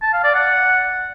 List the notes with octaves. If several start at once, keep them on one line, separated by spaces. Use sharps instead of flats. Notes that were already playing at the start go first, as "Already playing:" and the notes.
A5
F5
D5
F#5